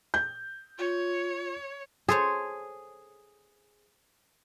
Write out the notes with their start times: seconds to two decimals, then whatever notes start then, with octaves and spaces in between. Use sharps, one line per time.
0.14 G6
0.78 F4 C#5
2.08 G#4 A4 C5 C#5